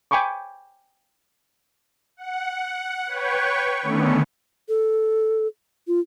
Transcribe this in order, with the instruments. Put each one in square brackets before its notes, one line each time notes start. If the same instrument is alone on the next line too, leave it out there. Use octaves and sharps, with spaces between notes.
[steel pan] G5 G#5 B5 C#6 D6
[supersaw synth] F#5
B4 C#5 G5 C#6
D3 D#3 A3 B3 C#4
[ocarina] A4
F4